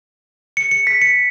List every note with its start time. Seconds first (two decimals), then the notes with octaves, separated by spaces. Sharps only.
0.57 C#7
0.71 C#7
0.87 B6
1.02 C#7